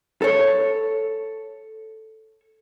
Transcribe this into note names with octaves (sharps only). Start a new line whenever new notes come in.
A4 C#5